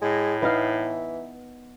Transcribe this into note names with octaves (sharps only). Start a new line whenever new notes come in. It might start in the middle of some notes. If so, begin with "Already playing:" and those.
A2 G#3
E3 B3 D#4 F5